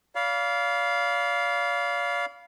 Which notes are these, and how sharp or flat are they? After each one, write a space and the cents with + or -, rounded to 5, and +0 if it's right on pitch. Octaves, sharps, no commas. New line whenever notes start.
D5 -40 F5 +0 B5 -20